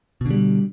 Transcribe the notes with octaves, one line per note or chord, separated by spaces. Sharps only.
B2 D3 G3